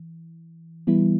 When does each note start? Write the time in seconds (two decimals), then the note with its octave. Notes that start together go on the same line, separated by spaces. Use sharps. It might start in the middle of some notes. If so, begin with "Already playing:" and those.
Already playing: E3
0.87 E3 G3 B3 E4